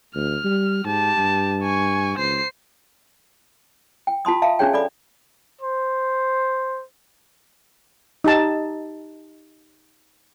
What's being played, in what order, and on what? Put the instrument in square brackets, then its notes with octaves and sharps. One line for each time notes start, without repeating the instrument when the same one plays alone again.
[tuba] D2 [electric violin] F6
[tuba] G3
[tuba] G#2 [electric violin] G4 A5
[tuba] G2
[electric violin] G#5 C#6
[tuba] C#2 [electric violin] C5 C7
[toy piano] G5
F4 A5 C6 D#6
E5 F5 A5 A#5
C#4 D4 F4 G#4 C#5 G5
A4 D5 B5 D6
[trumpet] C5
[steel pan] D#4 G4 A5